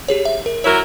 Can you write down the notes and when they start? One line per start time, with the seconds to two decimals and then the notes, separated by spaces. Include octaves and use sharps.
0.08 G4 G#4 C#5
0.25 E5
0.46 A#4
0.64 F#3 E4 A#4 C#5